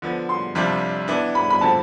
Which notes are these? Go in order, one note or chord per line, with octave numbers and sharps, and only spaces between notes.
D3 F3 B3
C6
F2 C3 G3 D4 F4
E3 B3 D4
B5
B5
D3 F3 C4 A5